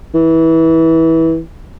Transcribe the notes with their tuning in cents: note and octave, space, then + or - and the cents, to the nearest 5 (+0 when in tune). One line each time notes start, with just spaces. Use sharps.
E3 -20